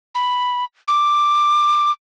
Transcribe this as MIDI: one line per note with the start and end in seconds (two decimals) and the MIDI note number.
0.15 0.64 83
0.88 1.91 86